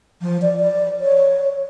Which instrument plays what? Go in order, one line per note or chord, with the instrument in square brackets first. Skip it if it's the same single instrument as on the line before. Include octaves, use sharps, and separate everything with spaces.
[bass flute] F3
D5
D5
C#5